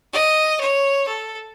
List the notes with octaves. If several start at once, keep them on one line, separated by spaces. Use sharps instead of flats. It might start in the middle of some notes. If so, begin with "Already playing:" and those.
D#5
C#5
A4